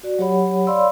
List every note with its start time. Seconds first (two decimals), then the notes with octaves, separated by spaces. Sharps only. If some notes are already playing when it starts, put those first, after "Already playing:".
0.03 F#4 D5
0.19 F#3 G4 C#5 F#5 B5
0.67 C#5 D5 F5 B5 C6 E6